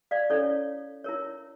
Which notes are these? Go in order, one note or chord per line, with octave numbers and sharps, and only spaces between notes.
D5 F5
C#4 E4 A4 C#5 D5
E4 A#4 C#5